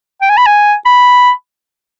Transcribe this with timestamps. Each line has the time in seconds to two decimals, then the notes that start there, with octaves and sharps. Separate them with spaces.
0.22 G5
0.30 G#5
0.37 B5
0.46 G#5
0.86 B5